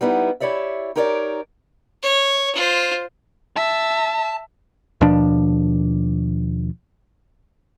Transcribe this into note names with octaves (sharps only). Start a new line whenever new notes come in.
G3 B3 D#4 E4
E4 G4 C#5 D5 E5
D#4 G4 A#4 C#5 D5
C#5
F4 C5
E5 A5
D#2 B2 F3 D4